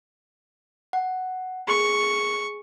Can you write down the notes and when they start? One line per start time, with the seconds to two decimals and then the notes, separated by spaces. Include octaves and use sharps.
0.93 F#5
1.68 G#4 C#6